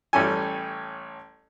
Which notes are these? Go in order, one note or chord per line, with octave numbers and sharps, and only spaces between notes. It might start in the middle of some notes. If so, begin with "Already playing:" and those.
A1 G3 C#4 G4 A4 G#5